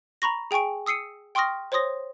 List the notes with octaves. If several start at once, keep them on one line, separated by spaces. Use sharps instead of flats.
A#5 B5 C#6 A#6
G#4 G5 G#5 C#6 D7
D#6 E6 C7 C#7 D#7
G5 C6 C#6 D#6 F6 A#6
C5 C#5 C6 D#6 A#6